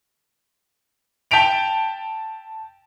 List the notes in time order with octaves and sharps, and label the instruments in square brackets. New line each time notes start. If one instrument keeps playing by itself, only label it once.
[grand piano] G5 A5 G6 B6 D7 F7